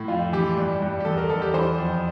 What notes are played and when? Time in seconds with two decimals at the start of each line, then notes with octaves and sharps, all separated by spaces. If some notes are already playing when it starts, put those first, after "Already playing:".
Already playing: A2
0.08 F2 F4
0.32 E3 G4
0.57 G2
0.82 G2
1.00 G4
1.05 E2 A4
1.18 A#4
1.30 E2 A4
1.42 G4
1.54 E3 C5
1.78 F2